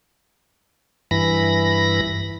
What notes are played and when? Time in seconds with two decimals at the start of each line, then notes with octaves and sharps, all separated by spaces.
1.11 G2 E3 B5 A#6